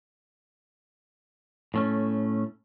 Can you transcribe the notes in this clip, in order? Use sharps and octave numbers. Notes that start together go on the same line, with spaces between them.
A2 A3 C#4